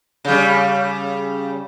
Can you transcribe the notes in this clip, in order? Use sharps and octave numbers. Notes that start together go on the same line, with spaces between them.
C#3 G3